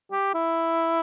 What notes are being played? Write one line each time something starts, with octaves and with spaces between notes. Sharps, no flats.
G4
E4